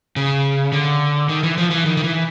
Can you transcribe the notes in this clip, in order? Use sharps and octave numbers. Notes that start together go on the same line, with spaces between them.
C#3
D3
D#3
E3
F3
E3
D#3
D#3
E3